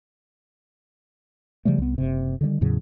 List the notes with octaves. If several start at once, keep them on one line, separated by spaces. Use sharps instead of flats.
C#3 F3 G3 A3
C2 B3
F#1 C3
D3 D#3 F#3 G3
E2 A2 C#3 F#3